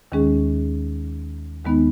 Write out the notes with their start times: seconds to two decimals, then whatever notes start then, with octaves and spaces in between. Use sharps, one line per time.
0.12 D#2 D#3 G#3 C#4 G#4
1.65 D#2 D#3 G#3 B3 D#4